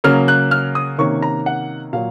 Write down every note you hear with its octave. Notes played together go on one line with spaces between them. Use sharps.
C#3 F#3 A#3 C#4 F6
F#6
F6
D#6
C3 D#3 A#3 C#4 C#6
A#5
F#5
A#2 F#3 F5